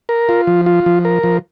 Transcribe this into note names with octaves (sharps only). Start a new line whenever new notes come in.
A#4
F4
F3
F4
F3
A#4
F3